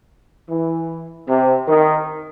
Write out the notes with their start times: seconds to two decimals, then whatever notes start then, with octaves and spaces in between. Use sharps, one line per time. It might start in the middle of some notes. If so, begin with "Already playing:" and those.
0.49 E3
1.28 C3
1.67 D#3